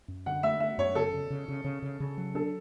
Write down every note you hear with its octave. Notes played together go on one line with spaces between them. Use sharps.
F#2
D3 F#5
A3 E5
A3 E5
F#2 C#5
C#3 A4
C#3
C#3
C#3
C#3
C#3
C#3
F#3
D4 A4